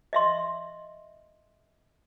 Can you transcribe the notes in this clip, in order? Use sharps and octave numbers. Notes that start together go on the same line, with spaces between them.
D#5 E5 C6